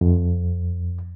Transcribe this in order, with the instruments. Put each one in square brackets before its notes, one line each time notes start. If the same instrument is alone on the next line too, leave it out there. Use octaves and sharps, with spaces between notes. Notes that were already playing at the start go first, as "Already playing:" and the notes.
[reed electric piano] F2